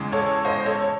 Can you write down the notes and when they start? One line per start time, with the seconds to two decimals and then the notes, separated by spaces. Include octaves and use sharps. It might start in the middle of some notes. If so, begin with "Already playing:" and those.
Already playing: E2 C#3 G#3
0.12 A4 C#5
0.45 C5 D#5
0.66 A4 C#5
0.82 C#5